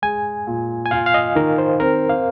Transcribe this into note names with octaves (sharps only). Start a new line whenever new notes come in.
G#3 G#5
A#2
G#5
F4 F5
F5
D#5
D#3 A#4
C5
C4 A#4
F5